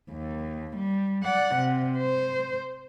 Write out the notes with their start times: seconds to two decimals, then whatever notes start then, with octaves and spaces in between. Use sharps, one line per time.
0.10 D#2
0.76 G3
1.23 D5 F#5
1.55 C3
1.98 C5